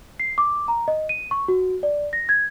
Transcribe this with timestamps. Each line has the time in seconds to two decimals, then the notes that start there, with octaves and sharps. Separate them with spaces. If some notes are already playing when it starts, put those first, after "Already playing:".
0.20 C7
0.38 D6
0.68 A#5
0.88 D#5
1.09 D#7
1.31 C#6
1.48 F#4
1.83 D5
2.13 A#6
2.29 G#6